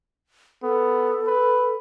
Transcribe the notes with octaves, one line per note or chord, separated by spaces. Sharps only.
B3 A4
B4